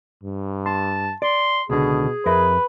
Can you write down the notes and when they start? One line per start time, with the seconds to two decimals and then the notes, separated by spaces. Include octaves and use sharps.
0.23 G2
0.66 A5 C6
1.22 D5 C6
1.70 C#2 B2 D3 G#4
2.26 F2 A#4 B4 E5